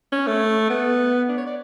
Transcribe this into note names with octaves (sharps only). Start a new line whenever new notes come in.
C#4
A3
B3
D4
C#5
D5